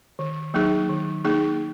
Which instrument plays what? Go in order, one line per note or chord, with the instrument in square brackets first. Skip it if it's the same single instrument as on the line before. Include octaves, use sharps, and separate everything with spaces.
[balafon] D#3
F#3 A#3 D#4 G#4
D#3
A#3 D#4 G#4